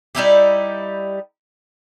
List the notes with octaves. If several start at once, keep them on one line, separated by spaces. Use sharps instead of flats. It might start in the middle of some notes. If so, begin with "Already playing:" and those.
G3 D#4 E4 G4